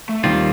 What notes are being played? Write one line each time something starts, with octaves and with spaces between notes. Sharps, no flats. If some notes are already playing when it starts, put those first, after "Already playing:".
A3
D#2 D#3 G3 A#3 C4 F4